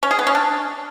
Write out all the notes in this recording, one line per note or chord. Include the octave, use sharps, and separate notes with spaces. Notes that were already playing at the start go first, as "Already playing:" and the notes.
C#4
G#4
B3
C#4
D4